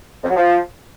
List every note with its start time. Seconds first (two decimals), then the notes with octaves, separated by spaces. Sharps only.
0.23 F2
0.30 F#3
0.36 F3